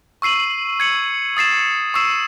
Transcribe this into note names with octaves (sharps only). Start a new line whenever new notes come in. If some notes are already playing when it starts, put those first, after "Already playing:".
C#6 E6 C7 D#7 F#7
G#6 C#7 F#7
D#6 A6 C7 E7
C#6 E6 C7 E7